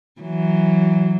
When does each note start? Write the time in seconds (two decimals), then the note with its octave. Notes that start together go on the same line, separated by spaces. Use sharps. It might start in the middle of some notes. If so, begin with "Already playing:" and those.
0.21 E3 F#3